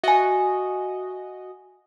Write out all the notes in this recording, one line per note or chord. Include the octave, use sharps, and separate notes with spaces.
F#4 D#5 E5 G#5